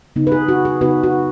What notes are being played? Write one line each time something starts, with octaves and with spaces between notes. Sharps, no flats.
C#3 B3 D#4
B4
G#4
F#4
G#4
C#3 B3 D#4 F#4 B4
F#4